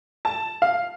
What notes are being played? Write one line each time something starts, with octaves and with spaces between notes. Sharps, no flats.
A5
F5